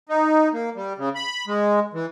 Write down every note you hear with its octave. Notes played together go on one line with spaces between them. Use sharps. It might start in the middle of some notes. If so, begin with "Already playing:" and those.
D#4
A#3
G3
C#3
B5
G#3
E3